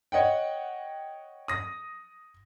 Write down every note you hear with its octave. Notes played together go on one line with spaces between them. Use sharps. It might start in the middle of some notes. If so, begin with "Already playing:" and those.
C#5 D#5 F#5 G5
D#6 A#6